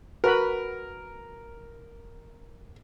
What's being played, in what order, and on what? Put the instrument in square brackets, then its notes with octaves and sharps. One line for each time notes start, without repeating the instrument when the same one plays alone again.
[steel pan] F#4 B4 B5 [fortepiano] A#4